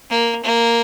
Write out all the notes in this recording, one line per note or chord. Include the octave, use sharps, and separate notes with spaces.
A#3
A#3